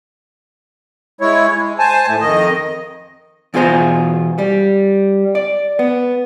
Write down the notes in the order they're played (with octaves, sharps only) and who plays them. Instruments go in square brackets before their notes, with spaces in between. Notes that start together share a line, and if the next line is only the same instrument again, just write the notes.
[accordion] G#3 E4 C#5
G#3
C5 G#5 A5
A2 A3
F2 D#3 D#5
[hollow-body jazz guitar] E2 B2 F4 G#4 C5 A#5
G3
D5
B3